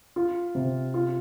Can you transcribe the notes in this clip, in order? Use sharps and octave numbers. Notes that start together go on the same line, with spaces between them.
F4
C3
F4